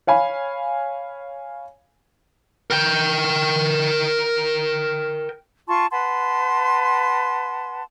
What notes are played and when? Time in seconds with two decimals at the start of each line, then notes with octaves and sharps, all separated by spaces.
0.07 C#5 F5 G#5 B5
2.71 A#4 G5
5.68 F4 A5 C6 C#6
5.91 B4 F#5 A5 C6